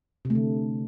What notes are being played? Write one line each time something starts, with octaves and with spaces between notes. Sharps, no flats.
C3
A3
D3